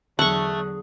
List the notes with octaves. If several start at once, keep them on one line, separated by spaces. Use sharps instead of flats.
E2 D3 F#3 A3 G#4 F#5 C#6